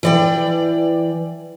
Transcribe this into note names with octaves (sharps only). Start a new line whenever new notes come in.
E3 D5 G5